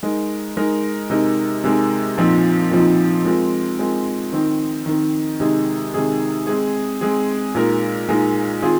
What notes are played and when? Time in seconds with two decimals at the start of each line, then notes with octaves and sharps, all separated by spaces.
0.03 G#3 D#4 A#4
0.57 G#3 D#4 A#4
1.10 C3 G#3 D#4 A#4
1.64 C3 G#3 D#4 A#4
2.18 A#2 F3 C4 D#4
2.71 A#2 F3 C4 D#4
3.25 G#3 C4 F4 A#4
3.79 G#3 C4 F4 A#4
4.32 D#3 C4 D#4 A#4
4.86 D#3 C4 D#4 A#4
5.40 C3 D#3 G#3 D#4 G#4
5.94 C3 D#3 G#3 D#4 G#4
6.47 G#3 C4 G#4
7.01 G#3 C4 G#4
7.55 A#2 G#3 D#4 A#4
8.09 A#2 G#3 D#4 A#4
8.62 D#3 C4 F4 G#4